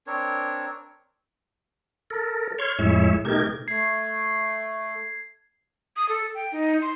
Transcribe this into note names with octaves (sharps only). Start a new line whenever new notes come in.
C4 D4 A#4 C#5
A4 A#4
C#5 C6 F6 G#6
F2 A2 G#3 E4 C#5 E5
B2 A3 D#4 G4 A#4 G#6
A3 G#6 C7
D#6
A4
G5
D#4
C6